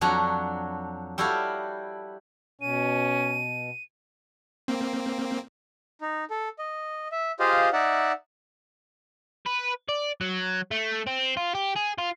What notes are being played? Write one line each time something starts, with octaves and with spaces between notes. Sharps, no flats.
F2 F#3 D4 F#4 C#5 A#5
G3 E4 F#4 G4 A4 F5
B2 C#4 D#7
A#3 C4
D#4
A4
D#5
E5
F4 G4 G#4 C5 D#5 F5
D#4 D5 E5 F#5
B4
D5
F#3
A3
C4
F4
G4
G#4
F4